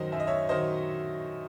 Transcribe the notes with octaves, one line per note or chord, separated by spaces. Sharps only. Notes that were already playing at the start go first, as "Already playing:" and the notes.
Already playing: F#2 D#3 F#3 C5 D#5
F#2 E5
D#5
C#5 E5
D#3 F#3 C5 D#5